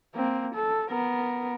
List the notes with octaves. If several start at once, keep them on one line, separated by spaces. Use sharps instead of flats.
A#3 C4
A4
B3 A#4